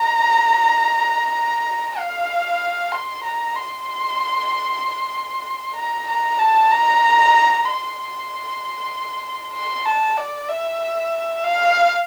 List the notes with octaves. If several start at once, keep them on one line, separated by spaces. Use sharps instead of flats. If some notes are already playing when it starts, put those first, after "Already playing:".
Already playing: A#5
F5
C6
A#5
C6
A#5
A#5
A5
A#5
C6
C6
A5
D5
E5
F5